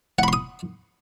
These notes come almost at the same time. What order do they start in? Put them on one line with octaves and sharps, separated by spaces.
F#5 B5 C6 D#6